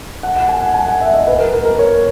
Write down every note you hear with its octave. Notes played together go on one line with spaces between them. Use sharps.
F#5
F#5
G#5
F#5
G#5
F#5
E5
D#5
B4
A#4
A#4
A#4
C#5